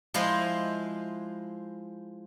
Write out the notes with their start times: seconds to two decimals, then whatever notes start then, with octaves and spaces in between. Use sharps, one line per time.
0.14 F3 G#3 E4 F4 C5